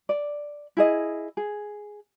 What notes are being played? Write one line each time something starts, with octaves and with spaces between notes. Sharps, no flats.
D5
E4 G#4 D#5
G#4